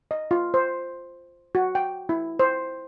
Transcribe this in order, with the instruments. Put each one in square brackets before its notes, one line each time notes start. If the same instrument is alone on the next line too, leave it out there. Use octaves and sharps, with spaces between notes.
[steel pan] D#5
F4
C5
F#4
G5
E4
C5